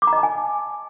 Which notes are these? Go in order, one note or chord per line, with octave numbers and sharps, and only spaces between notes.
D6
A#5
D#5
A5
G#5